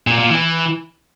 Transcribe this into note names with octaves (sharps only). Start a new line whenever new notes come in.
A#2
A#2
E3